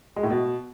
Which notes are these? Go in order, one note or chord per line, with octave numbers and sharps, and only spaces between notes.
G#3
A2
B2